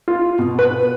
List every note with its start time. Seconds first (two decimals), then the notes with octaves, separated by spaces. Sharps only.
0.08 F4
0.39 B2
0.59 B4